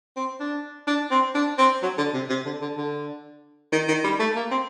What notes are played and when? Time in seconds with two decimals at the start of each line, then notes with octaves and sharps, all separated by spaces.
0.16 C4
0.40 D4
0.87 D4
1.11 C4
1.35 D4
1.58 C4
1.82 F#3
1.98 D3
2.14 C3
2.30 C3
2.46 D3
2.62 D3
2.78 D3
3.72 D#3
3.88 D#3
4.04 G3
4.20 A3
4.36 A#3
4.51 C4